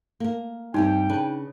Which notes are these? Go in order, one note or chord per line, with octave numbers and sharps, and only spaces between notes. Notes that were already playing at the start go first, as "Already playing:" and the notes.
A#3 A#4
G2 G3 C4 D#4 G5
C#3 D4 B4